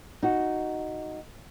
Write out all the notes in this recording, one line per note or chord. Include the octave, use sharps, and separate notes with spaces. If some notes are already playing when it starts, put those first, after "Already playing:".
D#4 F#4